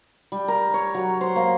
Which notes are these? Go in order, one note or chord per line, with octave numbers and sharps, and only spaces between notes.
G3
A#4
C#5
F#3
C5
A#3